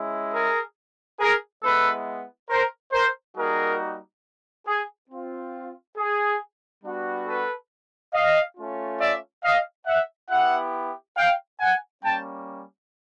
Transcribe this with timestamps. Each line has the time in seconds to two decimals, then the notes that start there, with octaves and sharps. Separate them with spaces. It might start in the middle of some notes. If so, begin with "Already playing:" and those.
Already playing: G#3 C#4 E4
0.33 G#4 A#4
1.20 G#4 A#4
1.63 G#3 B3 E4 A4 B4
2.49 A#4 C5
2.93 A#4 C5
3.36 G3 A#3 D#4 F#4 G#4 A#4
4.67 G#4
5.10 C4 F4
5.96 G#4
6.83 G3 B3 D4 F#4
7.27 A4 B4
8.13 D#5 F5
8.56 A3 C#4 F4
9.00 D5 E5
9.44 D#5 F5
9.86 E5 F#5
10.30 B3 E4 G4 E5 F#5
11.17 F5 G5
11.60 F#5 G#5
12.03 G3 A#3 C#4 G5 A5